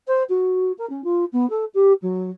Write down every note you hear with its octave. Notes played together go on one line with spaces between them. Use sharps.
C5
F#4
A#4
C#4
F4
B3
A4
G4
F#3